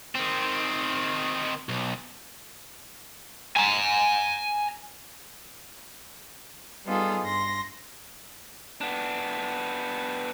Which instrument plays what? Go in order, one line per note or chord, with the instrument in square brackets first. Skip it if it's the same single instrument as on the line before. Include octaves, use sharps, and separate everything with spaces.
[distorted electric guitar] D#3 C4
B1
[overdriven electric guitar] G#5 A#5
[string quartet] G3 B3 D#4 F4 G#4 A4
G2 C6 A#6
[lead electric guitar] B3 D4